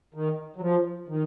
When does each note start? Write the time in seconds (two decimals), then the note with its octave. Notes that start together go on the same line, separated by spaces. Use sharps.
0.14 D#3
0.56 F#3
0.61 F3
1.09 D#3